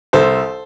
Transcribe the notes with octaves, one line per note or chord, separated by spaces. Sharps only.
C2 A4 C5